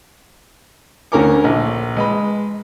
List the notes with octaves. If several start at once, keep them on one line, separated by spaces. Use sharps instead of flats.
D2 D3 C#4 A#4 G#5 D6
A#1
G#3 B4 B5